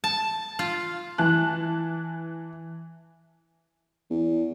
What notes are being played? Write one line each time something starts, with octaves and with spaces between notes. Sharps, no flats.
A5
F4
E3 A5 F#6
E2